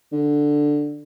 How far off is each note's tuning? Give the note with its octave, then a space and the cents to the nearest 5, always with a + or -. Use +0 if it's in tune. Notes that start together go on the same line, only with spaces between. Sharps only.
D3 +5